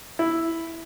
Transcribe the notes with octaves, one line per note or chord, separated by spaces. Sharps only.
E4